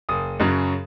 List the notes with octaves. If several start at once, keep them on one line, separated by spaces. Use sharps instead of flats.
F#1 D#6
F#2 C#3 F#3